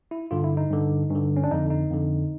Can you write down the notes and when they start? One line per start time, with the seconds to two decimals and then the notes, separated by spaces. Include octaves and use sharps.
0.11 E4
0.31 G2 D3 F4
0.44 E4
0.57 D#4
0.71 G2 D3
1.10 G2 D3
1.37 C#4
1.44 D4
1.51 F2 D3 D#4
1.70 D#4
1.91 F2 D3